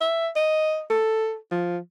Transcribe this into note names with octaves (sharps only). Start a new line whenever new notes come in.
E5
D#5
A4
F3